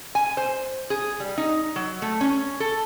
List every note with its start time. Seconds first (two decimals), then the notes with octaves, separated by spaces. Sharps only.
0.15 G#5
0.37 C5
0.90 G#4
1.20 G3
1.38 D#4
1.76 F#3
2.02 A3
2.21 C#4
2.60 A4